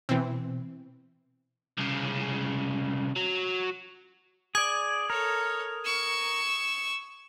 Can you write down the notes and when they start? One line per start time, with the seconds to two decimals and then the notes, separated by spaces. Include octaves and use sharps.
0.09 B2 E3 C4
1.78 C2 C#3
3.16 F#3
4.55 G#4 D5 D#6 G#6
5.10 A4 A#4 C#5
5.85 C#6 E6